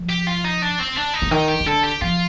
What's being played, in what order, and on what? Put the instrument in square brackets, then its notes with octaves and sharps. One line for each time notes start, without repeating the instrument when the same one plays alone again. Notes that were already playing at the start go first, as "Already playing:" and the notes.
Already playing: [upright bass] F3
[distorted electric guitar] G4
F4
D#4
D4
C4
D4
D#4
[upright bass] D3
[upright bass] D#3 [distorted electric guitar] D#4
[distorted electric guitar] G4
[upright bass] D#3
[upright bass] D3 [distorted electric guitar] A4
[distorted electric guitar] G4
[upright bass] F3 [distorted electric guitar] F4